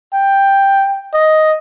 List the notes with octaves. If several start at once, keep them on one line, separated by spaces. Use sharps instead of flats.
G5
D#5